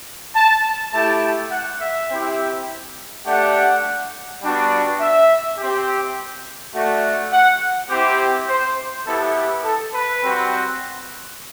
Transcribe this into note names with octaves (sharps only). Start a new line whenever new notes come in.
A5
A3 E4 G4 A5
F#5
E5
C4 E4 G4
A3 D4 G4 F#5
G3 B3 D4 F#4
E5
C4 G4
A3 D4 F#4
F#5
C4 E4 G4
C5
B3 E4 G4 A4
G4
A4
B4
G3 C4 F#4